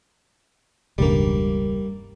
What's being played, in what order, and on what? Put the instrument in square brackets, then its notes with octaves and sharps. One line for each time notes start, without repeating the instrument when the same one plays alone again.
[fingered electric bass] E1 C#2 G2 [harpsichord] G3 A#3